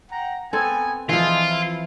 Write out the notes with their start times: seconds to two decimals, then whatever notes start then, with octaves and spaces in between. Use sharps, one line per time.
0.11 F#5 G5 A#5
0.53 B3 C4 A4 G#5
1.09 E3 F3 F4 G#4 D#5 E5
1.51 E4